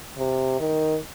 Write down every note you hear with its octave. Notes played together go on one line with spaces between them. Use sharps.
C3
D#3